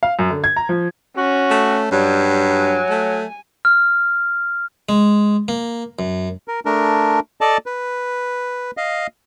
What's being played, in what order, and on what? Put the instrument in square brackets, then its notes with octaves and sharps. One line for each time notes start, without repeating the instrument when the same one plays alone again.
[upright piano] F5
F#2
D3
G#6
A#5
F3
[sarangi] C#4 [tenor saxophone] F#4
[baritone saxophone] A3
[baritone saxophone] G2 [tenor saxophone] F#3 [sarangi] G3
[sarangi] G#5
[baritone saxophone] A3
[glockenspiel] F6
[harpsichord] G#3
A#3
F#2
[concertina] A#4
A3 D4 A#4
A4 D5 D#5 A5
B4
D#5 F5